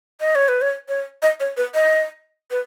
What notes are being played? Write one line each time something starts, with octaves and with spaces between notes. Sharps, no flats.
D#5
C#5
B4
C#5
C#5
D#5
C#5
B4
D#5
B4